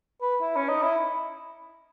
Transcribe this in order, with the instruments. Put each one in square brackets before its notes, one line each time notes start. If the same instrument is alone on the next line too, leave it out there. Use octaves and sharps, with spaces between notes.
[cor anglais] B4
E4
C#4
D#4
E4